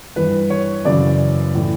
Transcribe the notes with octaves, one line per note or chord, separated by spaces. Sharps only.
G2 E3 B4
C#5
F#2 C#3 E3 D5
A2 E3